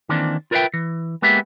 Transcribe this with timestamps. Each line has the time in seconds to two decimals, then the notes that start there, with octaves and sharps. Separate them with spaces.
0.09 D#3 E3 A#3 C4 D4
0.51 F4 A#4 B4 C#5 E5 G5
0.74 E3
1.22 G#3 A#3 B3 G4 E5